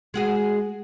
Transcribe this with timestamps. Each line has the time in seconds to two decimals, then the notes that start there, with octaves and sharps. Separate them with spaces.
0.14 G#3 F#4 G#4